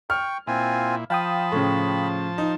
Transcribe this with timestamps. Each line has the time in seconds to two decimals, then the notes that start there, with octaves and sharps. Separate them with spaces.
0.10 G5 C#6 F6
0.47 A#2 C4 E4 F4 G#5
1.10 F3 F5 G5 A5 B5 D#6
1.52 A2 C#3
2.38 D#4